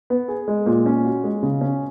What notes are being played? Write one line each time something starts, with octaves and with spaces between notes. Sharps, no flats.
B3
G#4
G#3
A#2
C#4
F#4
G#3
C#3
C#4